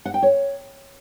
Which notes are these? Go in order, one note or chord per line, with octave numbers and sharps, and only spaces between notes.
F#5
G5
C#5